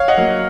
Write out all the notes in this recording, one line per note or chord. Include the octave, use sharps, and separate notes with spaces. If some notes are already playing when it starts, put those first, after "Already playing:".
Already playing: C#5 F5
D#5 F#5
F#3 A#3